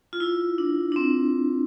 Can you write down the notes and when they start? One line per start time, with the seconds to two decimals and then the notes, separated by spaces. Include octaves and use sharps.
0.13 F4
0.20 E4
0.58 D4
0.92 D4
0.96 C4